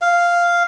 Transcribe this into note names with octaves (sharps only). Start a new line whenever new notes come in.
F5